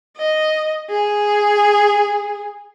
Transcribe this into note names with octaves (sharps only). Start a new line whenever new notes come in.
D#5
G#4